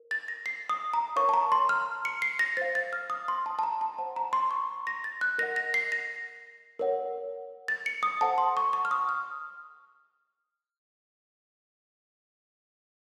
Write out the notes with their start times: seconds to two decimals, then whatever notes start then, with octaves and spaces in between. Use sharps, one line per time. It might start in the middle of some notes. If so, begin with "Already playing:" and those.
Already playing: A#4
0.11 A6
0.28 A#6
0.46 C7
0.69 D#6
0.94 A#5
1.16 A#4 C#5 F5 C#6
1.29 A5
1.34 A#5
1.52 C6
1.69 F6
2.05 C#7
2.22 C7
2.39 A#6
2.57 C5 F5 A6
2.75 A6
2.93 F6
3.10 D#6
3.28 C6
3.46 A5
3.59 A5
3.63 A#5
3.81 A5
3.98 C5 F#5 A5
4.16 A#5
4.33 C6
4.51 C#6
4.87 A#6
5.04 A6
5.21 F#6
5.38 A#4 D#5 F#5 A#6
5.56 A#6
5.74 C7
5.92 A#6
6.79 A#4 C#5 F#5
7.68 A6
7.86 C#7
8.03 D#6
8.21 A4 C5 F#5 A5
8.38 C6
8.57 C#6
8.73 C#6
8.85 F6
8.91 D#6
9.09 F6